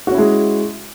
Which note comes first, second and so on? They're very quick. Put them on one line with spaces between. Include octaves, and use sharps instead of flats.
F#4 C#4 E4 G#3